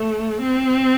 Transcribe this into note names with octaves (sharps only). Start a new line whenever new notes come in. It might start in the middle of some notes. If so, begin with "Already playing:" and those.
Already playing: A3
C4